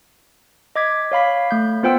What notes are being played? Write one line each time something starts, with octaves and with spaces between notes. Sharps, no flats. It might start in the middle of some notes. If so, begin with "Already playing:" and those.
D#5 D6 G#6 B6
C#5 F5 B5 B6
A3 G6
B3 F4 C5 F#5 G5 E6